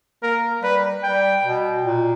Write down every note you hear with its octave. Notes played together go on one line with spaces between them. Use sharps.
A#3 A#4
G3 B4
G3 G5
B2
A#2